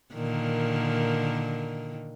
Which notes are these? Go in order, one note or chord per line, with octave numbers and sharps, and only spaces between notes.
A#2 D3 D#3